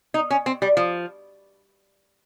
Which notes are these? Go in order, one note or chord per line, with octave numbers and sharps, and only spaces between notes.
D#4
C#4
C4
G3
F3